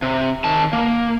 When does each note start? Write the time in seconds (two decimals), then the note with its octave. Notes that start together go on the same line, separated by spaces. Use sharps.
0.02 C3
0.44 D#3 A5
0.73 A#3